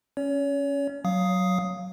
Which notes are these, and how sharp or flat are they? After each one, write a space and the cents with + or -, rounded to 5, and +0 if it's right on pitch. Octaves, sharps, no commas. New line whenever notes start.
C#4 +0 C#5 +35
F#3 +5 F5 +0 D#6 +5